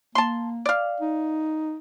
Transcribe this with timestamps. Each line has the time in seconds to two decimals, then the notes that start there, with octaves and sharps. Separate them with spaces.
0.15 A#3 A5 C6
0.66 D5 F5
1.00 D#4